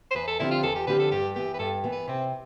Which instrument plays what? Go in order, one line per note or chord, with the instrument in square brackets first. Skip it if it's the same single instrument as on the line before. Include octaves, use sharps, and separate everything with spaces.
[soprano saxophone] C5
[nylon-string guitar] E2 [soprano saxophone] B4
[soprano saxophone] A4
[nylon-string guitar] D3 F3 C4 G4 [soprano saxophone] E4
[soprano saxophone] F4
[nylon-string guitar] E2 [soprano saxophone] A4
[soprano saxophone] G4
[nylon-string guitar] D3 F3 C4 G4 [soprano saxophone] B4
[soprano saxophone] A4
[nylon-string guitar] G2 [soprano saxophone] G4
[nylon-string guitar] E3 B3 [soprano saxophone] G4
[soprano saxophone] B4
[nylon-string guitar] G2 [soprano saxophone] A4
[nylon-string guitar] E3 B3
[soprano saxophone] B4
[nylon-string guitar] C3 [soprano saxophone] C4